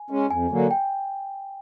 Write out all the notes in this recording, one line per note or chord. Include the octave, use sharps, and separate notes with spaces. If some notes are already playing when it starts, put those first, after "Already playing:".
Already playing: G#5
G#3 C#4
F2 G#5
D3 F#3 A#3
G5